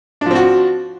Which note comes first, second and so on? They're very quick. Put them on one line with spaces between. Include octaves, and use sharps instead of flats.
D4 F3 C4 F#4